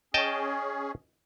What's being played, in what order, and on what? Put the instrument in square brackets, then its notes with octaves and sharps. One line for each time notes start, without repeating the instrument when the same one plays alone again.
[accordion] C#4 G#4 [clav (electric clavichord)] D#5 G5 A5